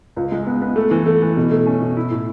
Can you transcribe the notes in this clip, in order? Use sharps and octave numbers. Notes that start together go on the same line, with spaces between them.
C#2
G#3
B3
B3
A3
E3
A3
E3
B2
A3
C#4
B2
E4
A2